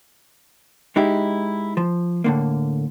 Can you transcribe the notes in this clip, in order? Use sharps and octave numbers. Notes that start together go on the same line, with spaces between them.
G#3 D#4 E4 G4
F3
A2 D3 A#3